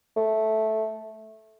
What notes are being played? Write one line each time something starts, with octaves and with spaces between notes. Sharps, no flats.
A3